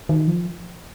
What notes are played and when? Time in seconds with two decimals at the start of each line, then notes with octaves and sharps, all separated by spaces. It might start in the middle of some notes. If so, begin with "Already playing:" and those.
0.09 D#3
0.27 F3